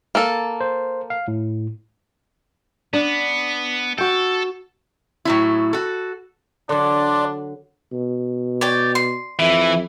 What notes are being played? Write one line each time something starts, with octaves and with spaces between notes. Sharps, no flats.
A#3 A4
C5
F5
A2
B3 D4
F#4 A4 G5
A2 F#3 E4
F#4 A4
D3 F#3 D4 D5 C6 D6
B2
C#5 D5 G5
C6
F2 E3 E5